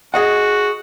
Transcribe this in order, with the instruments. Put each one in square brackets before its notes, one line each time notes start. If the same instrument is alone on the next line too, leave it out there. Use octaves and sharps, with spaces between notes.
[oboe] F#4 [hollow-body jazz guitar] G#4 D#5 F#5